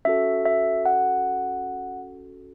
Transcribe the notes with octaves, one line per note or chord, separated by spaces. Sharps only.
C#4 F#4 A4 E5
E5
F#5